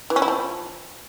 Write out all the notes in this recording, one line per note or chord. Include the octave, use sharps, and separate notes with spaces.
E3
C#4
E4
F3